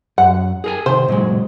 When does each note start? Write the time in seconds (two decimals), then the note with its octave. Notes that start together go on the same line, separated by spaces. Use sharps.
0.18 F#2 F#5
0.64 G#4 A#4 G#5
0.86 C3 D#3 C5
1.08 A#2 F#3 G#3